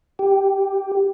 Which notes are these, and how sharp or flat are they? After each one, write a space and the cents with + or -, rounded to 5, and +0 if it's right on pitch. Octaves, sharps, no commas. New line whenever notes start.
G4 +0